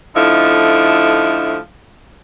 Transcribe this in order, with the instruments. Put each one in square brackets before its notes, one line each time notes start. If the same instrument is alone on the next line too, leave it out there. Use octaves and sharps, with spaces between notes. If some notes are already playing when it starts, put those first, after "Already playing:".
[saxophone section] D3 F3 A3 D#4 E4